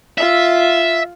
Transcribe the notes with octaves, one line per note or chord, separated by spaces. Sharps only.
F4 E5